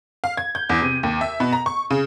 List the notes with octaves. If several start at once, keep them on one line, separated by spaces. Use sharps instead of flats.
F5
G#6
G6
E2
C3
D#2
E5
B2
A#5
C#6
C#3